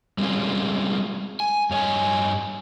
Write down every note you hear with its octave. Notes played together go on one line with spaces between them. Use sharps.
G3 G#3 C4 C#4 F4
G#5
G2 C#5 D#5 G#5